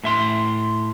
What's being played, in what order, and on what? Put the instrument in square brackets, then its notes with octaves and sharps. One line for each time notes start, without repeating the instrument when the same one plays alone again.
[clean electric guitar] A2 E5 C6